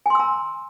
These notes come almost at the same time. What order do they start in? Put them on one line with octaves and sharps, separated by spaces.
G#5 C6 E6 A#5